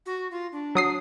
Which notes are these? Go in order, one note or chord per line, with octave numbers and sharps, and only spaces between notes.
F#4
F4
D4
F#3 D#6 C7